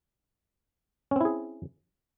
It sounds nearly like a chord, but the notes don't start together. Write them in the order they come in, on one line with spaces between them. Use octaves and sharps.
C#4 C4 E4 G#4